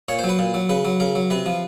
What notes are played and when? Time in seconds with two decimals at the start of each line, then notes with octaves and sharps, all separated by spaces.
0.08 A#2 C#5
0.19 C5
0.24 F#3
0.29 B4
0.39 A#2
0.54 F#3
0.69 C#3 B4
0.85 F#3
1.00 C#3 A#4
1.15 F#3
1.30 C3 B4
1.46 F3